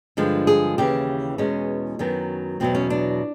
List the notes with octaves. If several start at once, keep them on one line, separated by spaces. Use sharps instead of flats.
G2 D3 F3 G#3
G#4
D#2 C#3 E3 G4
E2 B2 G#3 C#4
F#2 D#3 F#3 B3
E2 B2 F#3 C4
C#4
D4